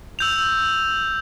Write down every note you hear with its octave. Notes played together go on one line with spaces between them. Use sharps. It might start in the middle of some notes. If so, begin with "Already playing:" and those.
E6 G6 F7